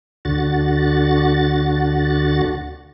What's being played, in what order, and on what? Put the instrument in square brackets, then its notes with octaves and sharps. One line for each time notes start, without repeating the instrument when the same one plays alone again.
[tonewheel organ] D2 D3 F#4 A6